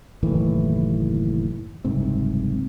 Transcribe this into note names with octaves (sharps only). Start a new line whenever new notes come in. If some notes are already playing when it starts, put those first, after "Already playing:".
F#1 D#2 A2 E3
F#1 C2 G#2 C4